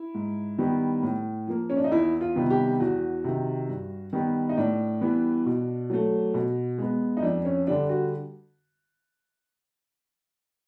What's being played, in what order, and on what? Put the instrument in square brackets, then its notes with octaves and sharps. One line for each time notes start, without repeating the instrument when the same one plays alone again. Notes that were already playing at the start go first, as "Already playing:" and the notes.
Already playing: [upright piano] E4
G#2
D#3 G3 B3
A2
F3 A#3
C#4
D4
D#4
E2 E4
F4
C3 D#3 G3 B3
G4
E2 F#4
C3 D#3
G2
D#3 G3 B3
D#4
A2 D4
E3 G3 B3
B2
F#3 A3
B2
G#3 B3
D#4
F2 D4
C#4
D3 G3 D4
F#4